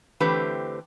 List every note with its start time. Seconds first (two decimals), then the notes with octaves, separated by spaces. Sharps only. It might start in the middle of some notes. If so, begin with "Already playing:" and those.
0.20 D3 E3 A3 C4 G4 B4